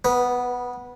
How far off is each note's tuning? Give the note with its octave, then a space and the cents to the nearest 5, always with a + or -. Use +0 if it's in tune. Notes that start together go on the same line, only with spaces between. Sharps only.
B3 +0 B4 -25